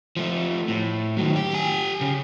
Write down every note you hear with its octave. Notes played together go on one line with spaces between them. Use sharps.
F3 A3
A2
D#3 F#3
G4
G4 G#5
C#3